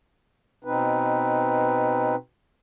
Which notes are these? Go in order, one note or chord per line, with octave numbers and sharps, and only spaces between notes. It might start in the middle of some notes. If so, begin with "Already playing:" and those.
B2 C4 D#4 B4